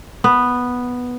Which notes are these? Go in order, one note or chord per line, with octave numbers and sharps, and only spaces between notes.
B3